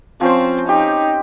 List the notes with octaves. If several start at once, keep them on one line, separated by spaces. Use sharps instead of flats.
F3 C4 C#4 C5
D#4 G4